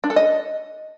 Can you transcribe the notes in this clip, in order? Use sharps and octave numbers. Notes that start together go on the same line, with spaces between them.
D4
A4
D#5